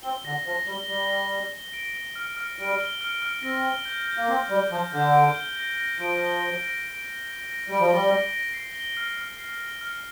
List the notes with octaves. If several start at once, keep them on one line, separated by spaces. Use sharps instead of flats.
C4 G7
D3 A#6
F3 A#6
G3 G7
G3 G7
A#6
A#6
G7
D7
G7
F6
F6
G3 D7
G7
F6
F6
C4 A#6
G7
G6
G6
A#3
C4 A#6
G3 G7
F3 G6
D3 G6
D7
G7
A#6
A#6
F3 D7
G7
A#6
A#6
D7
G7
A#6
A#6
G3 D7
F3
G3 G7
A#6
A#6
C7
G7
F6
F6
C7
G7
F6